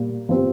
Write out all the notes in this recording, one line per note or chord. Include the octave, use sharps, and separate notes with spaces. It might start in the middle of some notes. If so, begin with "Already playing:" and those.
Already playing: A#2 G3 A#3
F3 C4 G4